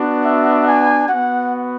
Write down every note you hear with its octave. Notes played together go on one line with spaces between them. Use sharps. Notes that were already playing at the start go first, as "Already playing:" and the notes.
Already playing: B3 D4 F#4
E5
G#5
B3 F#4 F#5